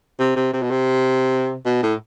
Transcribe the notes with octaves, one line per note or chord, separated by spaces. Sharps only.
C3
C3
C3
B2
C3
B2
A2